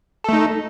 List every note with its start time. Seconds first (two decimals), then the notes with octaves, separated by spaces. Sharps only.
0.24 A4
0.29 A3
0.33 D#4